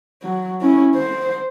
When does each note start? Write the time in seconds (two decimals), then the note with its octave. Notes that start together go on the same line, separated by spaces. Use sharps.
0.22 F#3
0.61 C#4 E4
0.95 C5